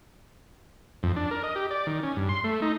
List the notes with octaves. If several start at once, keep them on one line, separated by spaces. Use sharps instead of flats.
F2
D4
A#4
D#5
G4
D5
D#3
C#4
G2
C6
A3
D#4